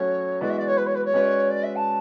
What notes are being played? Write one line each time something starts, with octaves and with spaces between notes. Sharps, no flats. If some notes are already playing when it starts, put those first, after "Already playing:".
Already playing: F#3 A3 C#4 F#4 C#5
E3 G#3 B3 F#4 D5
E5
D5
C#5
B4
C#5
B4
C#5
G#3 C#4 F#4 B4 D5
D5
E5
A5